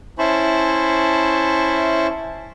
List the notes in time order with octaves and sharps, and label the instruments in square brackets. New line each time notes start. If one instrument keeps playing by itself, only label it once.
[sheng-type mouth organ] C#4 E4 C5 A5 B5 C#6